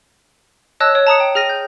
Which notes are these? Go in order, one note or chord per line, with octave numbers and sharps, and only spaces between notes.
C#5 D#5 A5 E6 F#6
C#5
A5 A#5 D#6 C#7
G5
G#4 F6 A#6 D#7
G6